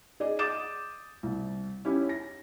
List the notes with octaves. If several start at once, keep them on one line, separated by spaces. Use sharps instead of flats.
G#4 D5 D#5
D6 D#6 G6 A6 E7
C2
C#4 E4 G4
A#6